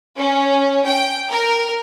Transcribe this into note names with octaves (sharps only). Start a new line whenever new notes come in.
C#4
G5
A#4